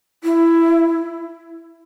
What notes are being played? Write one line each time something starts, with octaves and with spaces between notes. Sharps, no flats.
E4